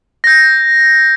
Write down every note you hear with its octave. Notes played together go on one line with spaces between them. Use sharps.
G6 A#6